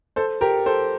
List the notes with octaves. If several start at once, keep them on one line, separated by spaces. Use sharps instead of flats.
A4 C5
G4 A#4
A4 C5